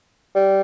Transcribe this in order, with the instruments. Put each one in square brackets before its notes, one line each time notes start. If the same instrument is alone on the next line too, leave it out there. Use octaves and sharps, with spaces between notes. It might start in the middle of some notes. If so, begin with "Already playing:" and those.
[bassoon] G3